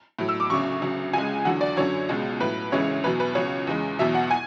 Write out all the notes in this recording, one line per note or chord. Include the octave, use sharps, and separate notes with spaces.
A2 F#3
E6
D6
D2 C#3 F#3 C#6
D2 C#3 F#3
C#2 C#3 G#3 G#5
E2 D3 F#3 F#5
D5
F#2 D3 F#3 C#5
C#2 B2 G#3
A2 F#3 B4
D2 C#3 E3 G#3 C#5
E2 B2 F#3 B4
B4
C#2 C#3 F#3 C#5
E2 C#3 G#3
E2 B2 F#3 E5
F#5
G#5